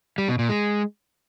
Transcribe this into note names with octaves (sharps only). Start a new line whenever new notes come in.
G3
B2
A#2
G#3